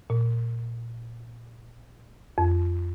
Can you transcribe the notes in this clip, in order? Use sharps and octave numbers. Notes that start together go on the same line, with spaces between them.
A#2
F2